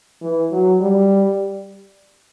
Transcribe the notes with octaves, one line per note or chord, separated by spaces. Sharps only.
E3
F#3
G3